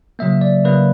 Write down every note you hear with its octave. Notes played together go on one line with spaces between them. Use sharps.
C#3 F#3 A#3 E5
D5
C#3 F#3 A#3 B4